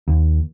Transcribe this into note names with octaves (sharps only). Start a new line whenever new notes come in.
D#2